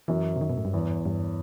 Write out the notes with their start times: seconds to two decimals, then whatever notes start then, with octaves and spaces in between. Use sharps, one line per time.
0.08 F#2 E3
0.36 C3
0.41 D#3
0.50 B2
0.57 A2
0.65 G2
0.73 E2
1.05 G2